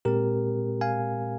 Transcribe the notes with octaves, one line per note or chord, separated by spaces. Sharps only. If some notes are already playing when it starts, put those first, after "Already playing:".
A#2 G#3 C4 G4 A#4
F5 G#5